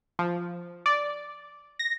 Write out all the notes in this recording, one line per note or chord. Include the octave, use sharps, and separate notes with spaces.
F3
D5
A#6